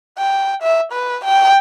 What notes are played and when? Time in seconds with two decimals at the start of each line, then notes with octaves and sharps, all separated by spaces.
0.18 G5
0.62 E5
0.92 B4
1.25 G5